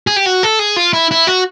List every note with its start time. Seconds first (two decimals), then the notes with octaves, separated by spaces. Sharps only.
0.07 G#4
0.16 G4
0.26 F#4
0.43 A4
0.59 G#4
0.76 F4
0.93 E4
1.11 E4
1.27 F#4